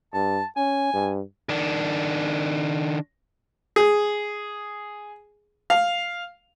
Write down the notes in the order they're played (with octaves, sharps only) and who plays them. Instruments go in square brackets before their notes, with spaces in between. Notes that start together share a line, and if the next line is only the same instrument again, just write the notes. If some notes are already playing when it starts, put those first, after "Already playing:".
[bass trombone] G2 [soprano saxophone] A5
[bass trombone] C#4 [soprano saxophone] G#5
[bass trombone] G2
[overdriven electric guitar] D#3 D4
[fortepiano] G#4
F5